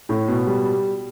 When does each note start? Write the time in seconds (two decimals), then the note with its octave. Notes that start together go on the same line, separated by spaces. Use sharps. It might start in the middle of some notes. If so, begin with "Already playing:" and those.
0.09 A2
0.28 B2
0.47 G3